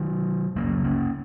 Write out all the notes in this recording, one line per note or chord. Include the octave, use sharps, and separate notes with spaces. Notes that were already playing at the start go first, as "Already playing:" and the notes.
Already playing: D#3 F#3
C#2 C#3 F#3 A#3
A#3 C#4